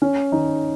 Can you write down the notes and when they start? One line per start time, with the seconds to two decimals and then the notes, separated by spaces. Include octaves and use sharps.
0.02 C#4
0.32 D#3 D#4